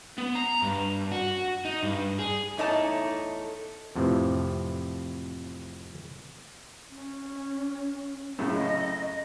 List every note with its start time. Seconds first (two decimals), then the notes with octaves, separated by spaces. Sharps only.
0.18 B3
0.35 A#5
0.62 G2
1.12 F#4
1.65 D#4
1.83 G2
2.19 G#4
2.57 E2 A3 D#4 C#5 A5
3.95 F2 A2 C3 E3 F3
6.89 C#4
8.39 F#2 A2 C#3
8.54 D#5